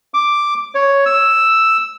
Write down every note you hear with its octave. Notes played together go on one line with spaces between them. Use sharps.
D6
C#5
E6